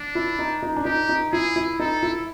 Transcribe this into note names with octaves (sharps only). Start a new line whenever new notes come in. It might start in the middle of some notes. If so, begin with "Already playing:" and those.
Already playing: D4
E4
D#4
D#4
D4
D#4 G4
D#4
E4 G#4
E4
D#4 A4
E4